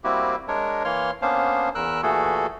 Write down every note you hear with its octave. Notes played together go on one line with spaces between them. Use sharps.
G3 A#3 C4 E4 F#4 G4
G#3 D4 A#4 C#5
E3 A#3 C#5 C6 F6
A#3 B3 C#4 D4 C5 F5
E2 A#4 E6 F#6
A#2 E3 A3 F#4 G#4 A4